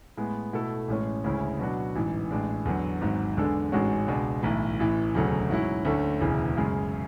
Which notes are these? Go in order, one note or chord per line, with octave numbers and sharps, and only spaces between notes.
A2 G#3 B3
B2 A3 E4 A4
A1 A2 G#3 C#4
D2 C#3 G#3 C#4 E4
B2 F#3 B3 D4 F#4
A1 G#2 E3
A1 A2 G#3 D4
E2 D3 F#3
G#1 G#2 F#3
E2 D3 G#3 D4 A4
A1 G#2 G#3 C#4 F#4
C#2 B2 G#3 D4
B1 A2 E3
A1 A2 E3
E1 D2 C#3 F#3 A3
G#2 F#3 C#4 E4
D2 D3 A3 C#4
E1 D2 C#3 E3
F#2 C#3 G#3